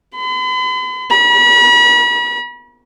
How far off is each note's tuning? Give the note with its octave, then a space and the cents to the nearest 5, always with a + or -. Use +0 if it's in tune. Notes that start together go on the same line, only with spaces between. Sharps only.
B5 +45
B5 -40